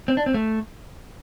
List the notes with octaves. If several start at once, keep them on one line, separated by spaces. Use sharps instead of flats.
C4
D4
C4
A3